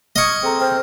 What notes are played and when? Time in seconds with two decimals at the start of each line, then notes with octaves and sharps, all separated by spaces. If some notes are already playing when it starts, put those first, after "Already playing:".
0.16 D#5 C#6 D#6 F6 G#6
0.43 C4 G#4 A4 A#5
0.60 C5 G5 F6